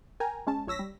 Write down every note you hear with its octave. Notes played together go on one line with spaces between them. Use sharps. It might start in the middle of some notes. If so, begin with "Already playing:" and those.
A#4 G5 G#5 A#5
G#3 C#4 A5
A#1 C#5 E6 A#6 B6
G3